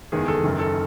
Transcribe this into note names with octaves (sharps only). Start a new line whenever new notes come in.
F#1 E2 D#3 G#3 G#4
A4
F#1 F#2 D#3
A4